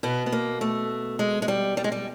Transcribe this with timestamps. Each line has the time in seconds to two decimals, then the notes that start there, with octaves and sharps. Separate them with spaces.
0.03 B2 B3
0.26 B3
0.32 A#3
0.61 A3
1.19 G#3
1.42 G#3
1.48 G3
1.77 G3
1.84 G#3
1.92 G3